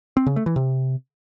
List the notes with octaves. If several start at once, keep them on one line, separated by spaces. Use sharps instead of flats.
C4
C#3
A3
E3
C3